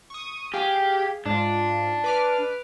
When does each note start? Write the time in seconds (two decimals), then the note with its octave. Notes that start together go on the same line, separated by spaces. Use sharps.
0.10 C#6 D#6
0.54 G4 G#4 F5
1.26 G#2 D4 F4
2.04 B4 D6 F6